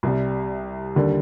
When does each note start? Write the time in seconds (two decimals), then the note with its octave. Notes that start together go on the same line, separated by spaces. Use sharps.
0.03 C2 C3 G3
0.96 D#2 D3 G3 A#3